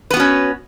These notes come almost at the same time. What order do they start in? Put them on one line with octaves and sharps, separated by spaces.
B4 B3 F#4 C#4